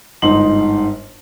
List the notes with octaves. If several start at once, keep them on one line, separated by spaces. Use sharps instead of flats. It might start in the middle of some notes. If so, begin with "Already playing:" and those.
G1 G#2 D#4 C6 F#7